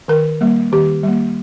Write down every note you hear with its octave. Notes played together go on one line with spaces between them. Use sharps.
D#3 A#4
G3 A#3
D#3 G4
G3 A#3